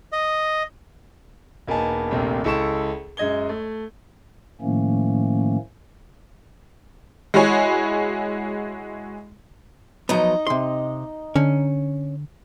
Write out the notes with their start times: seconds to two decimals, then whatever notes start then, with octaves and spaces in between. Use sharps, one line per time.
0.12 D#5
1.68 E1 A#3 B3 D#4 G#5 A5
2.11 A#1 D#2 C3 A3 A#3
2.44 C#2 E4 A4 C#6 E7
3.17 F#2 G#3 D#5 G#6 G7
3.49 A3
4.61 A2 D#3 F3 A3 A#3 C#4
7.34 G#3 E4 F#4 G#4 C#5
10.09 F3 F#3 B3 D#4 D#5
10.47 C3 C6
11.36 D3 C#4